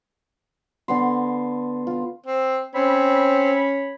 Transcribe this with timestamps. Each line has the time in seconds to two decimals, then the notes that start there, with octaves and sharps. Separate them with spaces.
0.88 D3 B3 C6
1.87 F4
2.26 C4
2.75 C4 C#4 C#5 B5